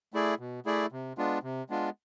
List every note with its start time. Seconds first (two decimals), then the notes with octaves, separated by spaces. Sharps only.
0.14 A3 E4 G#4 D5
0.39 B2
0.66 A3 E4 G#4 D5
0.92 C3
1.18 G#3 B3 D4 F4
1.43 C3
1.70 G#3 B3 D4 F4